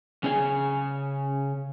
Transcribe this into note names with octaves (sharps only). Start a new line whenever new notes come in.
C#3 C#4 G#4 C5 G#5